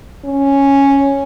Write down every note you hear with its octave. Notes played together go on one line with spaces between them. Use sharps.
C#4